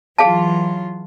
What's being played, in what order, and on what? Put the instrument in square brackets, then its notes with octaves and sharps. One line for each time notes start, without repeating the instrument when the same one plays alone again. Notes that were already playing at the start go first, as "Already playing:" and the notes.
[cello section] E3 F#3 F4 [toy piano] G#4 F5 A5